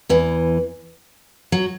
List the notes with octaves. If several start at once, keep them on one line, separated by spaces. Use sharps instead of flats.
E2 E3
F#3